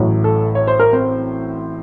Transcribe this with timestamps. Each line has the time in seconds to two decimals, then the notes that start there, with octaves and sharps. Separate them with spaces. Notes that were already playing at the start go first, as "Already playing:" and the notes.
Already playing: A1 A2 F#3
0.24 A4
0.55 C#5
0.68 C5
0.79 A#4
0.93 C4 C5